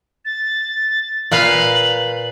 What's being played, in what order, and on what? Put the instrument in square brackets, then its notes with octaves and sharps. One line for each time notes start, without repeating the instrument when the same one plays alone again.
[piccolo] A6
[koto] A#2 B4 F5 [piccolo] F#7